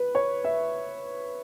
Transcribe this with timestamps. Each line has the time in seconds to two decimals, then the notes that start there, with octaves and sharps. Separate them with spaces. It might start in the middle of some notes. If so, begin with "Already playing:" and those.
Already playing: B4
0.15 C#5
0.44 E5